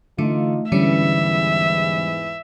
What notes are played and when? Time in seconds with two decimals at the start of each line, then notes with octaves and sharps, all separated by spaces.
0.18 D3 E3 A3 D#4 F4
0.72 E2 G#2 D3 E3 G3 C#4 E5